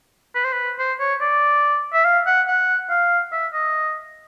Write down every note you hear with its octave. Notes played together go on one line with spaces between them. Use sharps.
B4
C5
B4
C5
C#5
D5
E5
F5
F#5
F#5
F5
E5
D#5